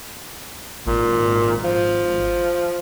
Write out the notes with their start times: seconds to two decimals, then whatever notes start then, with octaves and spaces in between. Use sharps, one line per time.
0.87 G#1 A#2
1.64 F3